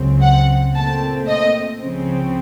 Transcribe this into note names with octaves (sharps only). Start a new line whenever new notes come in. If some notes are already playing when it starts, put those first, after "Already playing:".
Already playing: C#2 C#3 F#3 C4
F#5
A#2 A3 C4 A5
D#5
C#2 C#3 F3 C4